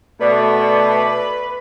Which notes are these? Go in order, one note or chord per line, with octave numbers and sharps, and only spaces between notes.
B2 A3 B4 D5